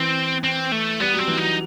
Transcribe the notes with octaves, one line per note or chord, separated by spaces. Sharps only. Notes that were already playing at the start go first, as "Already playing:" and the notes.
Already playing: E3 C4
C4
A3
G3 B3
F#3 C4
E3
F#3 D#4